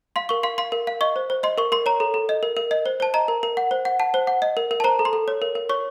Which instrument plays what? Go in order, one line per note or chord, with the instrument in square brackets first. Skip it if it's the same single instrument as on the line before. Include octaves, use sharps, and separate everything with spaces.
[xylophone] F5 C6
A#4 C#6
F5 C6
F5 C6
A#4
F5
D#5 C#6
C5
C5
D#5 C6
A#4 C#6
A#4 C6
C#5 A#5
A4
A4
D#5
A#4
A#4
D#5
C5
C5 A5
D#5 A#5
A#4
A#4
F#5
C5
F#5
F#5 A5
C5
F#5
D#5
A#4
A#4
A5
C5 A#5
A4
C6
A4
C#5
A#4
A#4
C#5 C#6